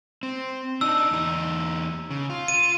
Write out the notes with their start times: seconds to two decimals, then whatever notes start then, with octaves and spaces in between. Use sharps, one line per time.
0.23 C4
0.81 D4 D#4 E6
1.11 E2 D#4
2.10 C#3
2.30 F4
2.48 D#7